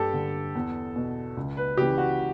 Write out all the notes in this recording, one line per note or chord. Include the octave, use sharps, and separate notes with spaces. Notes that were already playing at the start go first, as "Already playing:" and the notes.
Already playing: G2 G4 A4
D3
E2
B2
C#2
B4
C#3 E3 G4
F#4